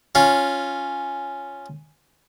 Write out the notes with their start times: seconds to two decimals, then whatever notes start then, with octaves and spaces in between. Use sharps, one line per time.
0.15 C#4 F4